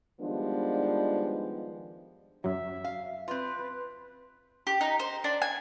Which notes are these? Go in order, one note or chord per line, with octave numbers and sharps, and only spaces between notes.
D#3 F3 G3 G#3 B3 D4
F#2 F#3 E5
F5
C4 F4 B4
G4
D#4
C5
D4
G#5